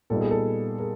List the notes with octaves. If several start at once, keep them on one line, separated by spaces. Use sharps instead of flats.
A#2 G3 B3 D#4 A4
G#4
A4
G#4 A#4